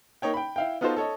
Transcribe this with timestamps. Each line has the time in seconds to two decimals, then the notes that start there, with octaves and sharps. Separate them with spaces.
0.22 A#3 D#4 C#5 G5
0.34 G5 B5
0.56 E4 F5 G5
0.81 B3 D#4 F4 F#4 A4 C5
0.96 A4 C#5 D#5